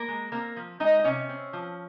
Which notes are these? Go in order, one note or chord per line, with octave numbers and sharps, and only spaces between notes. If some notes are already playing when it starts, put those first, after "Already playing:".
Already playing: A#3 A#4
G#3
A#3 C4 A#4
F3
G#3 D#4 D#5
D#5
C3 C#4 C#5
C4
F3